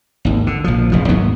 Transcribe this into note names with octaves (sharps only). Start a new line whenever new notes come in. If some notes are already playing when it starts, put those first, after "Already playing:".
G#1 D#2
D3
A#1 F3
F1 C#3 F3
D#2 G#2 F#3 B3